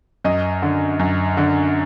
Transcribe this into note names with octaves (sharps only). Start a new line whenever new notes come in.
F#2 D#5
D3
F#2
D3